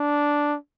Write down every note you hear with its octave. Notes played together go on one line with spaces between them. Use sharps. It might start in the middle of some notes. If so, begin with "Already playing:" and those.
Already playing: D4